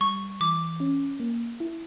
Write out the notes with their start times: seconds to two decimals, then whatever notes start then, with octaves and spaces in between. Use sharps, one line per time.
0.01 G3 C#6
0.41 E3 D6
0.80 C#4
1.20 A#3
1.60 E4